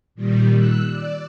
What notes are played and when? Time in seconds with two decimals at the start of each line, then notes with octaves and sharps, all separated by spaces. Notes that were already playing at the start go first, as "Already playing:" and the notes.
0.15 A#2 D#3 G3
0.55 E6 F#6
0.90 D5